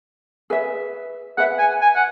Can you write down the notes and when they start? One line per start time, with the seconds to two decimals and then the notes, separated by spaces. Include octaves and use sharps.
0.50 G#4 B4 E5
1.37 G#4 B4 E5 F#5
1.58 G#5
1.81 G#5
1.96 F#5